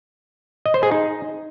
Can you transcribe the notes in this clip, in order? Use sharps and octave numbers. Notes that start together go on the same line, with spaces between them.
D#5
C5
G#4
D#4